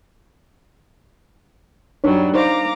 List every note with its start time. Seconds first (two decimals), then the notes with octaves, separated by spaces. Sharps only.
2.04 F#2 F#3 G3 D4 D#4 C#5
2.35 D#4 C5 F5 A#5 D6